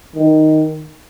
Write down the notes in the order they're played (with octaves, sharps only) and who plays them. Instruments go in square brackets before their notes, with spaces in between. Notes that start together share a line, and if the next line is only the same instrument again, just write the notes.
[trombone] D#3